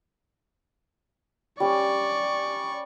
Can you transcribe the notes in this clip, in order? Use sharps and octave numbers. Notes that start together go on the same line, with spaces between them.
G3 C#4 D5 C#6